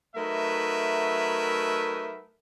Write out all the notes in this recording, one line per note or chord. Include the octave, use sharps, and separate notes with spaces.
F#3 A3 D#4 A#4 B4 E5